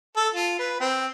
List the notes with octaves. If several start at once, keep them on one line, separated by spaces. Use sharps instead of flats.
A4
F4
B4
C4